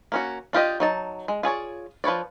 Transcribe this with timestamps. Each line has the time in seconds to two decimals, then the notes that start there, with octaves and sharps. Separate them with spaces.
0.12 A#3 C#4 F#4
0.53 D4 F4 G4 D#5
0.80 F#3 D#4 A5
1.28 G#3
1.43 F4 G#4 C#5 D5
2.04 F3 B4 C#5 D5